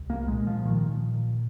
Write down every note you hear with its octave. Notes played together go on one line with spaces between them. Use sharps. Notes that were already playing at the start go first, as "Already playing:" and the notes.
Already playing: C2
A#3
A#2 G#3
F3
A#2 D#3